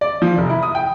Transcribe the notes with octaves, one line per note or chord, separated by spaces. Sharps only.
D5
F3
F1
E4
D#6
G5